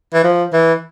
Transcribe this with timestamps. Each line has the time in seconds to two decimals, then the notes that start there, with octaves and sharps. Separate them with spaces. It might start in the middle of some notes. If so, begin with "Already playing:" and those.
0.14 E3
0.24 F3
0.53 E3